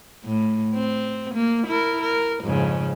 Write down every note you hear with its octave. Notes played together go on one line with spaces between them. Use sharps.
A2
C4
A#3
E4 A#4
A#4
F2 G#2 C#3